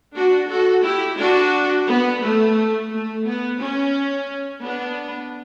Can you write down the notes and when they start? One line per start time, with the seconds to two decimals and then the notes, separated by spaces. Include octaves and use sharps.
0.15 D4 F#4
0.49 F#4 A4
0.83 E4 G4
1.18 D4 F#4
1.87 B3
2.22 A3
2.91 A3
3.25 B3
3.60 C#4
4.63 B3 D4